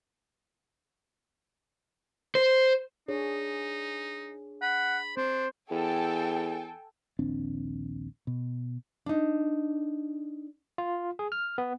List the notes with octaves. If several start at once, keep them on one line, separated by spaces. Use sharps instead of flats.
C5
D4 D#4 G#4 C#5
F#5 B5
C4 D4 C5
E2 A4 G5 G#5
A#1 D#2 C4 D4
B2
D4 D#4
F4
G#4
F6
B3